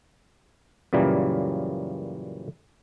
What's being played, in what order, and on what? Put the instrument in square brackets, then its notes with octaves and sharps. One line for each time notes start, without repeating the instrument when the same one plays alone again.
[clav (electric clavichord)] F#2 A#2 C#3 E3 G3 A#3